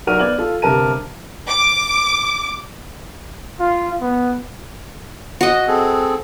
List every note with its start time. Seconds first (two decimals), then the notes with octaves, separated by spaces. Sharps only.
0.07 B1 F#4 A#4 D5 F6 D#7
0.19 B3 D5 G#6 F#7
0.38 F4 A4
0.62 G1 C3 A#4 A5 A#5 D#7
1.47 D6
3.60 F4
4.01 B3
5.41 F#4 D#5
5.68 C4 G#4 A4